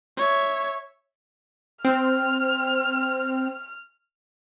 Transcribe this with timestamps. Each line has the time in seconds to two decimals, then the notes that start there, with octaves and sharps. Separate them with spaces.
0.17 C#5 E5
1.85 C4 F6